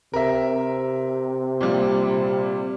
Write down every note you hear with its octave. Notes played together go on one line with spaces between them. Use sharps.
C3 A#4 E5
A#2 G3